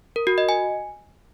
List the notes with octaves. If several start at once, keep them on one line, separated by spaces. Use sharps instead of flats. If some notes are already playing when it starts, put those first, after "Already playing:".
A#4
F#4
D#5
G#5